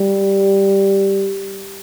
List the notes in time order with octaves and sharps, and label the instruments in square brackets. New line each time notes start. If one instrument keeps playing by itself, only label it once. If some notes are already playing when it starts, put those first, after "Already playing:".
Already playing: [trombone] G3